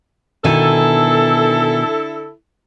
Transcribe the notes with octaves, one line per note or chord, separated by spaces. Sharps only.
B2 D3 D#3 E4 A4 G#5